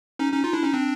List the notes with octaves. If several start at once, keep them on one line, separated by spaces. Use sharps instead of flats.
C#4 D#4
C#4 D#4
D#4 F4
D4 E4
C#4 D#4
C4 D4